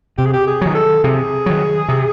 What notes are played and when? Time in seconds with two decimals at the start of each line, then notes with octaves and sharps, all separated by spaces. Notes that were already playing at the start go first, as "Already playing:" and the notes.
0.18 C3 G4
0.25 G#4
0.33 G4
0.47 G#4
0.61 D#3 F#3
0.75 A4
1.04 C3 G#4
1.46 D#3 F#3
1.89 C3